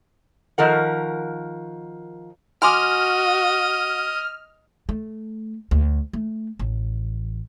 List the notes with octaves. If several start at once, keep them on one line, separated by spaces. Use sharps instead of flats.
D#3 F3 A#4 F#5
F#4 D#5 G#5 C6 D6 F6
A3
D2
A3
A1